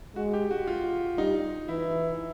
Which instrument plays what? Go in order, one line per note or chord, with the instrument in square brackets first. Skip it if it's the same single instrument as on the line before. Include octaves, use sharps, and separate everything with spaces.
[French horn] G#3 [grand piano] F#4
[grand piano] G4
F#4
F4
[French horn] G3 [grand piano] D#4
[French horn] E3 [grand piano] E4